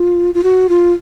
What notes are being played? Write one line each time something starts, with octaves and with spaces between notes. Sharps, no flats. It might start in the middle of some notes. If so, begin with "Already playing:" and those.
Already playing: F4
F4
F#4
F4